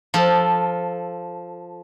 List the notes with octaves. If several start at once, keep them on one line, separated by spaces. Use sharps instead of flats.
F3 A4